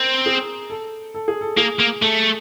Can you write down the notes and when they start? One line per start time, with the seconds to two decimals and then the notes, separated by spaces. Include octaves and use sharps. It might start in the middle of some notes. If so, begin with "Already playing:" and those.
Already playing: C4 A#4
0.26 G#4
0.70 A4
1.14 A4
1.28 G#4
1.41 A4
1.57 A#3 G#4
1.79 A#3
2.02 A3 A4